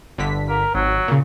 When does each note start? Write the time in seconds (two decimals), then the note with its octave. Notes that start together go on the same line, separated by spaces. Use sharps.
0.18 G1 D3 B6
0.49 A#4
0.75 G#1 F#3
1.08 A#2 C#3